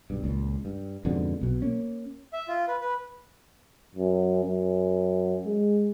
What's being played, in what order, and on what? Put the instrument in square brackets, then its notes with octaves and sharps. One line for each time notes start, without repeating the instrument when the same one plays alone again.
[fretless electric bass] B1 G2
C#2 A#2
G2
F2 G#2 B2 D3
B1 B2
A#3 C#4
[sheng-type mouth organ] E5
F4
B4
B4
[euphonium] F#2
F#2
G#3